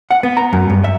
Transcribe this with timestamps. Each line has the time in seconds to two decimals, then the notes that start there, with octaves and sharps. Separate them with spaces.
0.11 F#5
0.23 B3
0.37 A#5
0.53 F#2
0.70 G2
0.84 E5